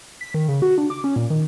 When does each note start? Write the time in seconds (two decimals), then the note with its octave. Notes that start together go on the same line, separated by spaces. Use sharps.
0.21 B6
0.34 D#3
0.48 C#3
0.62 F#4
0.78 D4
0.90 D6
1.04 C#4
1.16 A#2
1.30 D#3